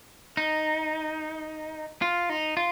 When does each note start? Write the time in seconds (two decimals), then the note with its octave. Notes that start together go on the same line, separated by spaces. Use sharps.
0.37 D#4
2.02 F4
2.30 D#4
2.57 F4